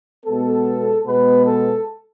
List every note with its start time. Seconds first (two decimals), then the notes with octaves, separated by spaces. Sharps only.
0.25 B2 G#3 B3 A4
1.06 B2 G#3 B3 B4
1.46 A4